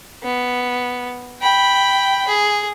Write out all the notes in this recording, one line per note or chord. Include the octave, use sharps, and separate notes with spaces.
B3
G5 B5
G#4